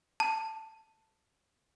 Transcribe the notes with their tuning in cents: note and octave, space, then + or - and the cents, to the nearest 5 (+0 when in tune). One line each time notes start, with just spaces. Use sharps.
A5 +10